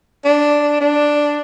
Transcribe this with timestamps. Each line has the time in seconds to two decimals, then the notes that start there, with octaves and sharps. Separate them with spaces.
0.25 D4
0.80 D4